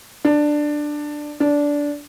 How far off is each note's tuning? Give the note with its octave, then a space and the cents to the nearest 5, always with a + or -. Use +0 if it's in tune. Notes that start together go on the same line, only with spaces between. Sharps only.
D4 +10
D4 -15